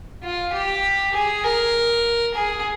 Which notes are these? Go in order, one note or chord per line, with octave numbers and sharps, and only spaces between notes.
F4
G4
G#4
A#4
G#4